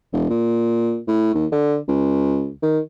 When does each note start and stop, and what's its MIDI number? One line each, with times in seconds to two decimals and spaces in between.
0.13 0.28 28
0.30 0.99 46
1.08 1.34 45
1.35 1.46 39
1.52 1.76 50
1.88 2.50 37
2.62 2.79 51